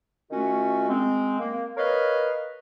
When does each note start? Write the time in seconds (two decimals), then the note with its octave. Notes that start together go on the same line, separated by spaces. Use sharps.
0.30 D#3 A3 C#4 F4 F#4
0.88 G#3 C4
1.39 A#3
1.76 A#4 B4 C#5 D#5 F5